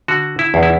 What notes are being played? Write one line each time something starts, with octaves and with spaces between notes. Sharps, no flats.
D3 F#4
E4
E2
E4